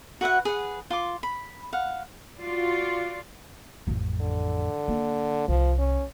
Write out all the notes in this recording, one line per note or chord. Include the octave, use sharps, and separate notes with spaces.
F#4 B4 E5 F#5
G#4 B4 F#5
F4 C6 D6
B5
F5 F#5
F4 F#4 D5
A1 F2
D3
A#3
C2 F3
C#4